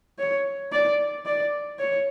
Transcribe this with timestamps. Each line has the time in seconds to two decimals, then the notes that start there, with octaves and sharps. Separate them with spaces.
0.19 C#5
0.72 D5
1.26 D5
1.79 C#5